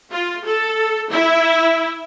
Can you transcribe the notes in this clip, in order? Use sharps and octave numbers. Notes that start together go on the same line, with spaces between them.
F4
A4
E4